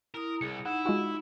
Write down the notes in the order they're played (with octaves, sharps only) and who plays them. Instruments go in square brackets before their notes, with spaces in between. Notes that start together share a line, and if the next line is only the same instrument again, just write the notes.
[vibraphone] E4 D#6 [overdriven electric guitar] A#4
[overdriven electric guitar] C2 [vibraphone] G#4 [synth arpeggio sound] C#7
[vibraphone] D#4 [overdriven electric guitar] E4 [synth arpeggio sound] F#5
[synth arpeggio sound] G#3 F4 F#4